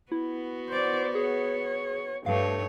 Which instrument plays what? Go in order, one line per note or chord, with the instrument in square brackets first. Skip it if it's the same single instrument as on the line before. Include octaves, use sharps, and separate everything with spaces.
[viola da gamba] B3 F#4 [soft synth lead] E4
[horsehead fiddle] C5 D5
[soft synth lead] G#4 [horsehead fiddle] C#5
[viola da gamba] G2 C#5 [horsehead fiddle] A3 [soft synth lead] F5